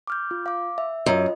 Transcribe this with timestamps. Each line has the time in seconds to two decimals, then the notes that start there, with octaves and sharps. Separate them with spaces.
0.07 D6 F6 G6
0.31 F4
0.46 F5 D6
0.78 E5
1.06 F#2 F4 D#5